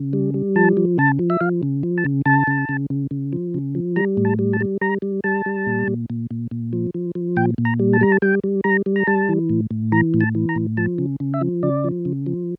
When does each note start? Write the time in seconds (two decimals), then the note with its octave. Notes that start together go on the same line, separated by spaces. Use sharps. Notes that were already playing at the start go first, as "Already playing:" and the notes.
Already playing: C#3
0.13 G3
0.34 G3
0.56 F3 A5
0.77 F3
0.98 C#3 A5
1.19 F3
1.30 E5
1.41 F3 F5
1.63 C#3
1.83 F3
1.98 A5
2.05 C#3
2.26 C#3 A5
2.47 C#3
2.69 C#3
2.90 C#3
3.11 C#3
3.33 F3
3.54 C#3
3.75 F3
3.96 G3 A#5
4.17 A2
4.25 A5
4.39 G3
4.53 A5
4.60 G3
4.81 G3 A#5
5.02 G3
5.24 G3 A5
5.46 G3
5.66 A#2
5.88 A#2
6.10 A#2
6.31 A#2
6.51 A#2
6.73 F3
6.94 F3
7.15 F3
7.36 A#2 G5
7.58 A#2
7.65 A#5
7.79 G3
7.93 A5
8.01 G3 A#5
8.12 A5
8.22 G3 G5
8.44 G3
8.64 G3 A#5
8.86 G3
8.96 A#5
9.07 G3 A5
9.29 E3
9.49 A2
9.71 A2
9.92 E3 A#5
10.14 A2
10.21 A5
10.35 E3
10.49 A#5
10.56 A2
10.77 F3 A5
10.98 C#3
11.20 C#3
11.34 E5
11.41 F3
11.63 C#3 D5
11.84 F3
12.05 C#3
12.26 F3